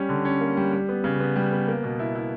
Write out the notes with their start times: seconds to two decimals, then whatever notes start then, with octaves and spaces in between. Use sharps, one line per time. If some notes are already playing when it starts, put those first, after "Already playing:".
Already playing: G3 C#4
0.09 D3
0.25 C#4
0.41 A#3
0.57 G3
0.72 G3
0.89 B3
1.04 C#3
1.20 B3
1.36 G3
1.52 B3
1.68 A#3
1.83 B2
1.99 E4
2.15 E4